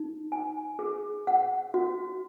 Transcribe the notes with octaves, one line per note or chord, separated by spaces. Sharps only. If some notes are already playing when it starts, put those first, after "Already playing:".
Already playing: D#4
G#5
G#4
F#5
F#4